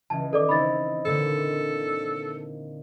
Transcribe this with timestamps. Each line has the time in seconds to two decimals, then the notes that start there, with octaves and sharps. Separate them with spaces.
0.10 C#2 E3 A5
0.33 D#3 A4 D5 D6
0.49 C4 D#4 E4 B5 A6
1.05 A#2 D3 A#3 A4